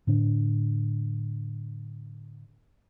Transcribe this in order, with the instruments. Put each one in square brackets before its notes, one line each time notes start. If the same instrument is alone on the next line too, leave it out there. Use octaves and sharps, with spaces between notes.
[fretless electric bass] A2 D3 D4